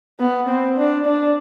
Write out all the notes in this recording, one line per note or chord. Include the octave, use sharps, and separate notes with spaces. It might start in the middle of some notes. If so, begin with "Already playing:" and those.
B3
C4
D4
D4